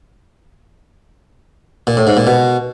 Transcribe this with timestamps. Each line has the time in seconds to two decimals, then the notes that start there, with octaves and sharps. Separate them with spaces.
1.87 A#2
1.97 A2
2.07 G#2
2.17 A#2
2.27 B2